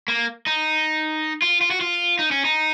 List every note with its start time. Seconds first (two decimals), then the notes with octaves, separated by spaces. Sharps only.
0.08 A#3
0.46 D#4
1.42 F4
1.61 F4
1.71 F#4
1.81 F4
2.19 D#4
2.31 C#4
2.45 D#4